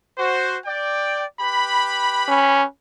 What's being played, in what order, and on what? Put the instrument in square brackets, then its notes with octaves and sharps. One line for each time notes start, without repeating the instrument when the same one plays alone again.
[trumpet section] F#4 C5
D5 G5
G4 B4 B5
[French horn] C#4